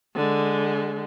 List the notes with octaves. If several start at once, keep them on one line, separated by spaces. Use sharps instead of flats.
D3 G#3